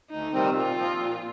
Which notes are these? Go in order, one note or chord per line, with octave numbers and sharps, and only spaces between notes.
D2 D#4
C3 D#3 G3 C4
A#2 F4
F3 C4
A#2